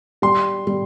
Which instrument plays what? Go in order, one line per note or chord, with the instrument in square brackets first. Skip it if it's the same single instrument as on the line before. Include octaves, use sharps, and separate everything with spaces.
[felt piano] G3 [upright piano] C6
[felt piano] G3